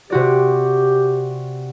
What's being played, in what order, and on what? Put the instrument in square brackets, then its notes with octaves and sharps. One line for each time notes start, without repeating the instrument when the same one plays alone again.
[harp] C3 F#4 D5 [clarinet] G4